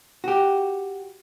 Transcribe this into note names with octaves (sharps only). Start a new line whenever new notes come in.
F#4 G4